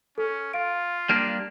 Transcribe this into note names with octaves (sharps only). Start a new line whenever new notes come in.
C#4 A4
F4 F5 D7
G3 A#3 D4 F6